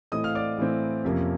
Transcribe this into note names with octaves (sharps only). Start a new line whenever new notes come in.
A2 E3 A3 C4 D#5 D#6
F5 F6
D5 D6
A2 E3 A3 C4
F2 C3 F3 A#3 C#4